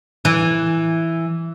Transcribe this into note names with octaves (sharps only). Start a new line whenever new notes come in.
E3